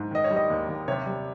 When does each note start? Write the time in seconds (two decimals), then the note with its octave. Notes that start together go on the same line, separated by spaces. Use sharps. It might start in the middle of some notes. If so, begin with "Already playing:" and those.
Already playing: G#2
0.11 D#3 D#5
0.24 C#5
0.31 G3
0.36 D#5
0.50 D#2
0.68 D#2
0.88 C3 C#5
1.06 G3